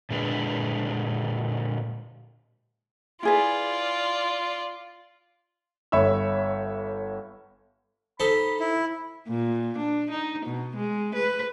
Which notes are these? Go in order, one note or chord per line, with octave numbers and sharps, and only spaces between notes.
A#2 D3 G#3 D4 B4
E4 F4 G#4 B4 D5
G1 C#5 E5 B5 E6
D#4 A4 C5 B5
E4
A#2
D4
D#4
B2
G#3
B4